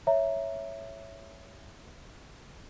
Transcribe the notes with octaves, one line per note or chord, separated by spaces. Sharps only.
C#5 E5 A#5